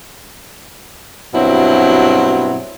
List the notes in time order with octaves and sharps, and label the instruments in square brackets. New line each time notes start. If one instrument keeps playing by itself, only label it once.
[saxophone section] G2 B2 F#3 C4 E4